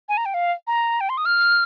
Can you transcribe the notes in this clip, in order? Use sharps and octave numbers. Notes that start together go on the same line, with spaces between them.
G#5
A#5
G5
F5
A#5
G5
C6
D#6
F6